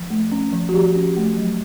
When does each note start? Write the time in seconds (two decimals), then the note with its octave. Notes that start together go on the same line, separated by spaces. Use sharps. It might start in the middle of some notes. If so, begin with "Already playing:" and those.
Already playing: F3
0.10 A3
0.32 C#4
0.53 F3
0.69 F#4
0.74 F3 G4
0.95 C#4
1.17 A3
1.37 F#3